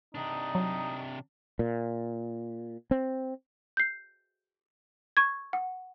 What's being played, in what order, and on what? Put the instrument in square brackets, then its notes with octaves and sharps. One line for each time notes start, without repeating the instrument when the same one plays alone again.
[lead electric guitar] C3 D4 [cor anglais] D#4
[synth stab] F#3
[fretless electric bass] A#2
C4
[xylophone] G6 C7
C#6 G#6
F#5